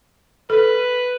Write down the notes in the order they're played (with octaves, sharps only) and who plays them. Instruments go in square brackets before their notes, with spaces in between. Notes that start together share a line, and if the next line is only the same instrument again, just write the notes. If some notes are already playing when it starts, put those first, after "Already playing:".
[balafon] A4 [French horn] B4